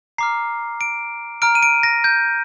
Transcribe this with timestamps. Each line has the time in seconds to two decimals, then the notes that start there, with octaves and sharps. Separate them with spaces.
0.18 A#5 D6 F6 C7
0.81 D7
1.42 A#5 F6 D7
1.55 D#7
1.63 D7
1.83 A#6
2.04 G6